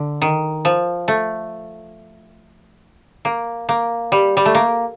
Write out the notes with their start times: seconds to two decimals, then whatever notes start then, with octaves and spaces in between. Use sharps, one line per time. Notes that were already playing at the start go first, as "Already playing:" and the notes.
Already playing: D3
0.22 D#3
0.65 F3
1.08 A3
3.25 A#3
3.69 A#3
4.12 G3
4.37 G3
4.45 A3
4.55 A#3